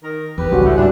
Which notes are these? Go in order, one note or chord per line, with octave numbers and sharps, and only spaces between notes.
D#3 A#4
F#1 E2 G4 B4
G#1 C#2 G3 C#4 F#4
A2
E1 G#2 G3 D4 E4